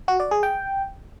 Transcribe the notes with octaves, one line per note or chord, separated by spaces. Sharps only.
F#4
D5
G#4
G5